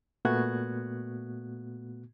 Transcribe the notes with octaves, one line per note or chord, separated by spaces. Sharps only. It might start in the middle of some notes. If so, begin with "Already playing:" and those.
A#2 A3 B3 F#4 F#6 G#6